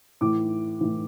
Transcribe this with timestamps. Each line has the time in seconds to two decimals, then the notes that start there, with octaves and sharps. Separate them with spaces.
0.21 A2 E3 D6
0.81 A2 E3